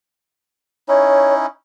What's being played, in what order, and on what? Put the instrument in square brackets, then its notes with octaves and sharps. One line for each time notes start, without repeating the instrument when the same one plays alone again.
[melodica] C#4 D#4 E4 [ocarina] C#5